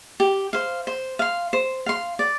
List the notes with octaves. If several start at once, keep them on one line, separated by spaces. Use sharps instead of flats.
G4
C5 F5
C5
F5 C6
C5
F5 C6
D5